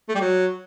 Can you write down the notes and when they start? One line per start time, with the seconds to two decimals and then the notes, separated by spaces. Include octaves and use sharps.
0.09 A3
0.15 G3
0.21 F#3